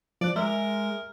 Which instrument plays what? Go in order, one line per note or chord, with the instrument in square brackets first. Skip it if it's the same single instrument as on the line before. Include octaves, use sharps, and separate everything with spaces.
[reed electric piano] F3 F#6 [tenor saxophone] D5
[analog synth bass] G#3 [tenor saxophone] A#4 [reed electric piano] E5